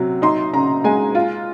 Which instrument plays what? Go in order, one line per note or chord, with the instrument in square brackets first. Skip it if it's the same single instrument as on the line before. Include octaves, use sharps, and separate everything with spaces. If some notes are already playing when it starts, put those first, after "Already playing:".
Already playing: [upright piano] C3 F#3
D#4 C6
C#3 A#5
G#3 G#5
F4